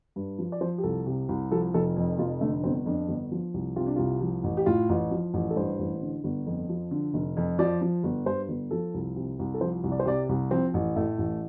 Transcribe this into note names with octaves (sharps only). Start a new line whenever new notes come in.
G2
F3
D5
F3 C5
G4
C2 A4
C3
C2
F3 A4
F1 A4
F2
F1 F4
D3 A3
G1 C4
F2 D4
G1
F3
C2
C3 F4
D4
C2 F4
F3
A1
G4
A2 F4
A1
F3
A1
A4
G2 C5
A1
D3
G1
F2
F3
D3
F1
F2
F3 D5
F3
G1
G2 C5
G1
F3 A4
C2
C3
C2
A4
F3 C5
C2
D5
C5
C3 D5
C2
F3 C4
A1
A2 A3
A1